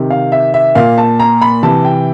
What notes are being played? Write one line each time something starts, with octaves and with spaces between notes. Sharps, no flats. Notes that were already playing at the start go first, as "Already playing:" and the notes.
Already playing: C3 D#3
F5
E5
E5
A#2 F5
A5
A#5
B5
C3 E3 A5
G5